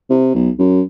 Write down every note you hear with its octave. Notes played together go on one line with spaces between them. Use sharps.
C3
B1
F#2